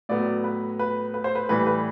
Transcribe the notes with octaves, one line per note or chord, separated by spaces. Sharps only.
A2 F#3 B3 D5
B4
B4
B4
C5
B4
A2 E3 G3 B4
B4